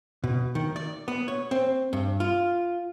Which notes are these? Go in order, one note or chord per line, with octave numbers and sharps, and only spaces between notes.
B2
D#3
D5
B3
C#5
C4
G2
F4